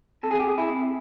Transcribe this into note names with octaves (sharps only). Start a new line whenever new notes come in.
C3 A4
G#4
G4
C3 G#4
E4
C3